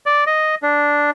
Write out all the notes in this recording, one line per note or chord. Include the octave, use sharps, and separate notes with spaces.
D5
D#5
D4